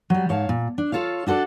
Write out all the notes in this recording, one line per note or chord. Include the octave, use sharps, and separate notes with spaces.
F#3 G3
G#2 C#5 F5 A5
A#2
D4
F4 A4 C#5 F5
D4 F#4 A4 C5 D5